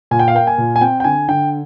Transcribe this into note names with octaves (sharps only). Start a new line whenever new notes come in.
A#2 G#5
G5
F5
A#3 G5
G#5
A#2
G#5
C4 G5
G5
D3 G#5
D3 G5